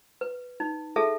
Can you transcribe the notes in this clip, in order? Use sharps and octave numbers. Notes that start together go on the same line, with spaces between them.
B4
D#4
G#4 A4 E5 A5